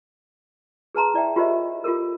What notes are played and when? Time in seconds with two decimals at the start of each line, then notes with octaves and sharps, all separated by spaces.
0.95 G#4 B4 A5 A#5 C6
1.14 E4 D5 E5 G5
1.36 F4 G4 A#4 C5 D#5 E5
1.84 F4 G4 A4 A#4